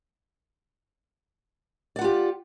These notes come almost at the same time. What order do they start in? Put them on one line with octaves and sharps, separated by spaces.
D5 F#5 F4 G4